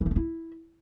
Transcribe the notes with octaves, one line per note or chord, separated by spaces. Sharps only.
E3
A3
D4
E4